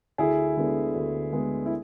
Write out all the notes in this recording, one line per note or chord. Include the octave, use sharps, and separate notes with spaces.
D2 E4 G#4
D3 G#3 B3
D2
D3 G#3 B3
E4